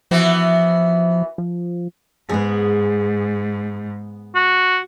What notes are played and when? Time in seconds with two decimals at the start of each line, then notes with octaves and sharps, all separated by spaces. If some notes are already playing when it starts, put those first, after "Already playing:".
0.11 E3 F3 B3 F#4
1.38 F3
2.29 G#2 B3 G#4
4.35 F#4